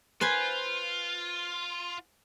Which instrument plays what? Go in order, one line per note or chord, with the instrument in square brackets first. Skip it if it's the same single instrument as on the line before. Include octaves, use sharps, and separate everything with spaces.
[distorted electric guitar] F4 [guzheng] B4 C5 G#5